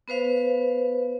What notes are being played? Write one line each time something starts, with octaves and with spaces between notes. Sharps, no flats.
B3 B4 C5 F5